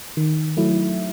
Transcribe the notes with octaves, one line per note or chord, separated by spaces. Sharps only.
D#3
F#3 A3 E4